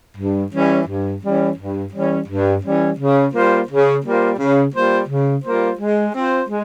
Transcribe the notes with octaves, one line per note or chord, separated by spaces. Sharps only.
G2
E3 G3 C#4
G2
E3 G3 C#4
G2
E3 G3 C#4
G2
E3 G3 C#4
C#3
G3 A#3 F4 C5
C#3
G3 A#3 F4 C5
C#3
G3 A#3 F4 C5
C#3
G3 A#3 F4 C5
G#3
C4 F4 C5
G#3